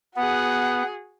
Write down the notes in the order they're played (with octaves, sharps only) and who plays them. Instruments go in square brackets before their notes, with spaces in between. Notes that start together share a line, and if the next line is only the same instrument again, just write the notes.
[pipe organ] B3 [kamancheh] F#4 G#4 [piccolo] F#5